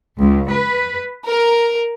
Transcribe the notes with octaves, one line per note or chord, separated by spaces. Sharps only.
C#2
B4
A#4